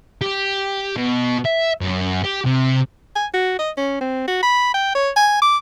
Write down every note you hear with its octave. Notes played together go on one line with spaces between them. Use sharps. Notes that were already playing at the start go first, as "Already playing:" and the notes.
G4
B2
E5
F#2
G4
C3
G#5
F#4
D#5
C#4
C4
F#4
B5
G5
C#5
G#5
D6